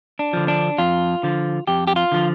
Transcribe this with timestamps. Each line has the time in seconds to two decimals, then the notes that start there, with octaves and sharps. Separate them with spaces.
0.19 D4
0.33 D3 F3
0.48 D4
0.78 F2 F4
1.23 D3 F3
1.67 F2 G4
1.87 G4
1.96 F4
2.12 D3 F3